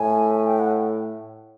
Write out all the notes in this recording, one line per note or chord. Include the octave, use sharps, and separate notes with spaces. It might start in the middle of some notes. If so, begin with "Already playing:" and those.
Already playing: A2 G#5
G#5
G5
F#5